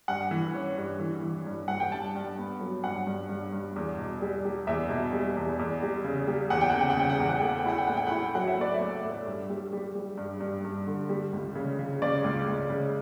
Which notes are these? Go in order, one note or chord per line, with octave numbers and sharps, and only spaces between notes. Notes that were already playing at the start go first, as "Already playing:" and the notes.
G2 F#5
E3
C#4
G2
E3
E3
G2
G2 F#5
G5
G2 A5
G2
B3
F#3
G2 F#5
G2
G2
G2
E2
B2
G3
G3
E2 E5
B2
G3
E2
E2
G3
C#3
G3
E2 F#5
G5
C#3 F#5
G5
F#5
C#3 G5
F#5
E2 G5
F#5
A3 G5
F#5
G5
E4 F#5
G5
A2 F#5
G5
E4 F#5
F#3 F#5
E5
A3 D5
E5
A3
A2
G2
G3
G3
G3
G2
G2
G2
D3
G3
C#2
C#3
C#3
C#3 D5
C#2
C#2
C#3